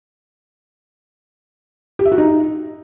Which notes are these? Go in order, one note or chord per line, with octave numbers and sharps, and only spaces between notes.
G4
E5
F#4
D#4